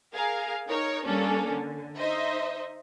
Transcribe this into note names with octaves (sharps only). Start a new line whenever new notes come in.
G#4 A#4 F5
D#4 A#4 C#5
G3 A#3 C#4 D4 A4
D3
D#4 C5 D#5 E5